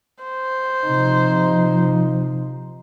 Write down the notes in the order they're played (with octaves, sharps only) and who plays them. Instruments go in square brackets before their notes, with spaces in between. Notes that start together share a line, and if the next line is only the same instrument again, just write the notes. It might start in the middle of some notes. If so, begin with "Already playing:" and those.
[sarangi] C5
[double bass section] C3 F3 [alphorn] D#4